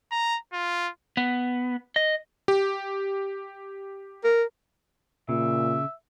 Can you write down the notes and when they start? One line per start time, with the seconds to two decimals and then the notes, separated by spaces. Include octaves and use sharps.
0.12 A#5
0.53 F4
1.17 B3
1.96 D#5
2.48 G4
4.24 A#4
5.29 A#2 C#3 E5